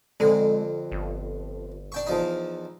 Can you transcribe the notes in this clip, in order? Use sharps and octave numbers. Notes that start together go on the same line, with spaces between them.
F2 D3 G#3
G1
D4 G5 C#6
E2 F3 D#4